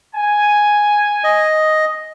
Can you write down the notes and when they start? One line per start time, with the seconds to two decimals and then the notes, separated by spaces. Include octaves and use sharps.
0.15 G#5
1.24 D#5